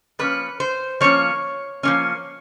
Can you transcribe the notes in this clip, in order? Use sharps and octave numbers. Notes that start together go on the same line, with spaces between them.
F3 A#3 C#4 B4
C5
F3 A#3 C#4 C#5
F3 A#3 C#4